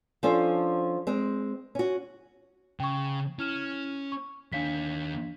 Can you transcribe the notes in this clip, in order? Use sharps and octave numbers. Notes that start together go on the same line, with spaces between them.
F3 C#4 D4 A4 C5
G#3 C4
C#4 F#4
C#3 G5 C#6
C#4 E4 F6 E7
C#6
D#2 D4 C#5 F5 B6